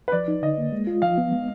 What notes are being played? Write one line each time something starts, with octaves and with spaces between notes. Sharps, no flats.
B4
F3 D5
D#4
D3 D#5
A#3
G#3
F4
F3 F5
B3
G#3